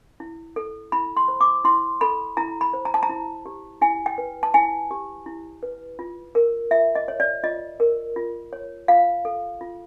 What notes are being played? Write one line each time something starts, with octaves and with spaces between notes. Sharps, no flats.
E4
A4
E4 B5
C6
C5
D6
E4 C6
A4 B5
E4 A#5
B5
C5
A#5
A5
A#5
E4
G4
E4 G#5
G5
B4
A5
E4 G#5
G4
E4
B4
F4
A#4
F4 E5
D#5
C#5
D5
F4 D#5
A#4
F4
C#5
F4 F5
A4
F4